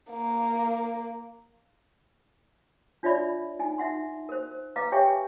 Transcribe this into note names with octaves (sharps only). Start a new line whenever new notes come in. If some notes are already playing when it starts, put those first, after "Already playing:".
A#3
D4 F4 C#5 D5 E5 B5
D#4 G#5
D#4 E5 F#5 C6
A#4 C5
B4 D#5 F5 A#5 D6
G4 C#5 E5 G5 G#5 C#6